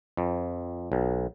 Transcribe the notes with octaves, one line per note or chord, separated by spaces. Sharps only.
F2
B1